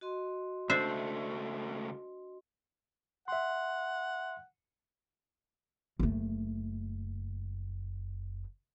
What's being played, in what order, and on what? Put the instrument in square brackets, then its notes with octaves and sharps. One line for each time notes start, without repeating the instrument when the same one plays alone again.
[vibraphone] F#4 D#5 C6
[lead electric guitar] C#2 A3 [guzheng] D4 C5 E5
[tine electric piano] E5 C6 [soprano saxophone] F#5
[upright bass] F#1 A3